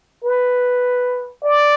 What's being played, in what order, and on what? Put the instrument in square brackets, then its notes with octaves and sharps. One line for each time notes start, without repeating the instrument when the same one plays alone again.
[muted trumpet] B4
D5